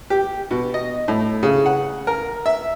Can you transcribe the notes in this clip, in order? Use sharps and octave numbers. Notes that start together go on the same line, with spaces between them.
G4
B2
D#5
A2
C#3
F#5
A#4
E5